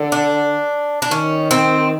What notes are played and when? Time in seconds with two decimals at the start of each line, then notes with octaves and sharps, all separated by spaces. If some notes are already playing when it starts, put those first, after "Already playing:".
Already playing: D3
0.12 D4
1.02 D4
1.11 D#3 C#4
1.51 C4